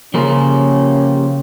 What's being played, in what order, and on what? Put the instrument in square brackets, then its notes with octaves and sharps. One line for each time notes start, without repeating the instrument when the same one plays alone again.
[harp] C#3 [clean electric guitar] F3 A#3 F4 [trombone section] C#4 G4